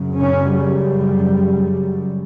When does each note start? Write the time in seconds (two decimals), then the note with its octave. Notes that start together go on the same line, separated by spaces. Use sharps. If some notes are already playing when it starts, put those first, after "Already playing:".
Already playing: F#2 C#3
0.17 C#4
0.50 G3